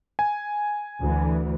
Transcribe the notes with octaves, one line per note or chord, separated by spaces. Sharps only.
G#5
D2 D3 E3